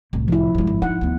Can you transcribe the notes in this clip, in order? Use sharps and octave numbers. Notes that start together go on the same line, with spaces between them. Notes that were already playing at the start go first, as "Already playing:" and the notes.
C2 A2
F3 E4
G2 G#3
G#1
D#4 F#5
D2 B3